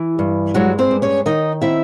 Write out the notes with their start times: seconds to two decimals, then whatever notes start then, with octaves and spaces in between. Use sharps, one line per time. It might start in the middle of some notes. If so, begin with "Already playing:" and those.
Already playing: E3
0.19 G2
0.54 F#3 G#3 F#4
0.79 C4 C5
0.91 G2
1.02 C#4 C#5
1.26 D#3 D#4 D#5
1.62 C4 E4 E5